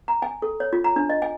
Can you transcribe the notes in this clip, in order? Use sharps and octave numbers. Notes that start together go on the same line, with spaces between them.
A#5
G#5
A4
C#5
F4
A#5
D4
D#5
G#5